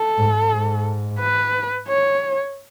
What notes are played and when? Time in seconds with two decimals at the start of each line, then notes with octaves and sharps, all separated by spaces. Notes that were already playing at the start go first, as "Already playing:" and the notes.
Already playing: A4
0.18 G#2
0.52 G#2
1.19 B4
1.88 C#5